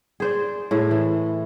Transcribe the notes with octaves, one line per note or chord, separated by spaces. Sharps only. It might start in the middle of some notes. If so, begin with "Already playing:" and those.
G#4 C5 D5
A2 G#4
E3